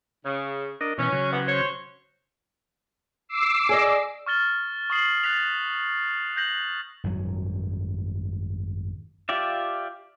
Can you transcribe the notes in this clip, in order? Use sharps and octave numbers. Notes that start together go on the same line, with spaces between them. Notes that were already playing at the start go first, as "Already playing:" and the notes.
C#3
D4 A#4 D#5
B2 E3 C#4
C#3 F#3
C3 E3 B3
C5 C#5
D6 E6 C7
G#4 D5 D#5
C#6 F6 A6 G7
C#6 D#6 C7 F#7
F#6 A6 B6 F7
F#6 G6 A#6 F#7
G#1 F#2 F#3
F4 G4 D5 E5